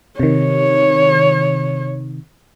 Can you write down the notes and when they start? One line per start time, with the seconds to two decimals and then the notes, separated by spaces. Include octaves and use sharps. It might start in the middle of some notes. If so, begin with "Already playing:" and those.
0.20 C3 D#3 C#5